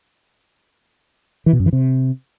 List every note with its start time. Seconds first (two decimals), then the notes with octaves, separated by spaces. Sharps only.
1.46 E3
1.53 B2
1.59 F#2
1.66 E3
1.73 C3